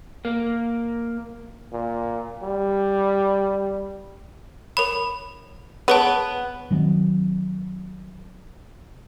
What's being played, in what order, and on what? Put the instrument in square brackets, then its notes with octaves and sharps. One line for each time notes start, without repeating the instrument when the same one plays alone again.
[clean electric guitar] A#3
[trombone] A#2
G3
[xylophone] A#4 C#5 B5
[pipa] B3 [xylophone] G#4 C#5 A5
[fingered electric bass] D#3 F#3 A#3 C4